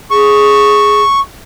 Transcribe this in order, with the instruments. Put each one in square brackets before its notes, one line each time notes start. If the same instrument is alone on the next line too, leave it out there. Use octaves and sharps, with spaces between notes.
[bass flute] G#4 [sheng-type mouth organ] C#6